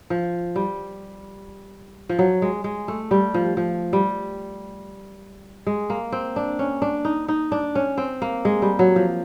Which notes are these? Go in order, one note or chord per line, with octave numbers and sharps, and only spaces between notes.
F3
G3
F3
F#3
G#3
G#3
A3
G3
F3
F3
G3
G#3
A#3
C4
D4
C#4
D4
D#4
D#4
D4
C#4
C4
A#3
G#3
G3
F#3
F3